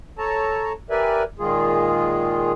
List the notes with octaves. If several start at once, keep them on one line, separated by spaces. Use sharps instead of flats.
A4 C#5 A5 A#5
G4 A#4 B4 D5 E5 G#5
A#2 D#3 G#3 F4 G#4